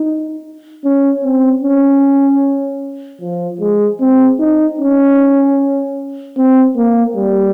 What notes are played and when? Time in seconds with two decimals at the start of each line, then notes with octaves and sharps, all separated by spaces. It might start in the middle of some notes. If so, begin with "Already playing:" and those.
Already playing: D#4
0.84 C#4
1.24 C4
1.63 C#4
3.21 F3
3.60 G#3
4.00 C4
4.39 D#4
4.80 C#4
6.37 C4
6.76 A#3
7.16 G3